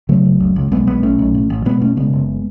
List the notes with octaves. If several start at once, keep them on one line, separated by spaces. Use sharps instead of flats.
C#3 F#3 A3
F#1
C#2
C#2
B1 G#3 B3
B1 G#3 B3
B1 A3 C#4
B1
A1
A1
B2 G#3 B3
E1 A3 C#4
C#3 G#3 B3
F#1